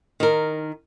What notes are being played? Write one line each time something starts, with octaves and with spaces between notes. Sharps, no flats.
D#3 A#4